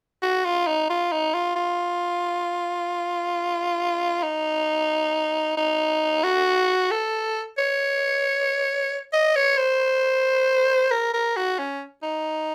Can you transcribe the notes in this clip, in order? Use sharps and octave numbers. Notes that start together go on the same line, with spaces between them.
F#4
F4
D#4
F4
D#4
F4
F4
D#4
D#4
F#4
A4
C#5
D#5
C#5
C5
A#4
A#4
F#4
C#4
D#4